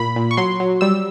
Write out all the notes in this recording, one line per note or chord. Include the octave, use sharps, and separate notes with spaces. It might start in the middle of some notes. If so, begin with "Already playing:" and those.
Already playing: A#2 B5
A#2
C#6
F#3 C6
F#3
G3 E6